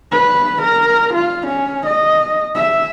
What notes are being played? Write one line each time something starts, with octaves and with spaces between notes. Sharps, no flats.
B4
A#4
F4
C#4
D#5
E5